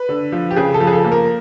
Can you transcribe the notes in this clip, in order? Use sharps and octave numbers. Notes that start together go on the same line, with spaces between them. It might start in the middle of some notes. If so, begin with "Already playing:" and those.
Already playing: B4
D3
F3
G4
C#3 G#4
A4
F3
G#4
A4
A#3
A#4